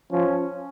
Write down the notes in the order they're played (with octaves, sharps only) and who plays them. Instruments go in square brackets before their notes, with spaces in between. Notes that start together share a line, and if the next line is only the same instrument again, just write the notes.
[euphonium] F3 [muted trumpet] C#4